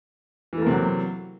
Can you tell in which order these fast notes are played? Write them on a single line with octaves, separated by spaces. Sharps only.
E3 A3 A#3 C3 F#3